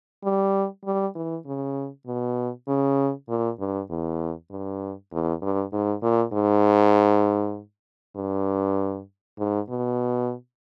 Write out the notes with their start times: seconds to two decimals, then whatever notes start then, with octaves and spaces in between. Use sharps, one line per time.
0.24 G3
0.85 G3
1.15 E3
1.46 C#3
2.07 B2
2.68 C#3
3.29 A#2
3.59 G2
3.90 E2
4.50 G2
5.12 E2
5.42 G2
5.73 G#2
6.03 A#2
6.33 G#2
8.16 G2
9.38 G#2
9.69 B2